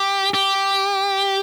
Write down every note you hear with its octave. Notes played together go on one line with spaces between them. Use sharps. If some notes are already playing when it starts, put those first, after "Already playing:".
Already playing: G4
G4